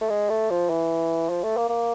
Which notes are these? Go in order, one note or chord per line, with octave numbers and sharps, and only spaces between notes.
A3
G#3
A3
F3
E3
F3
A3
A#3
A#3